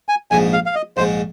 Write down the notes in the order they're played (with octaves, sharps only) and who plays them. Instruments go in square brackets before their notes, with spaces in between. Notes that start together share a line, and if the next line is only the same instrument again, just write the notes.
[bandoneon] G#5
[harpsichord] A#1 G#2 G#3 [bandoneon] G#5
[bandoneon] F5
F5
D#5
[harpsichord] A#1 G#2 G#3 [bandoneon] C5